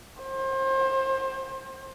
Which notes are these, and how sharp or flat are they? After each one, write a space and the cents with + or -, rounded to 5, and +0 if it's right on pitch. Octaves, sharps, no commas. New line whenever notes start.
C5 +30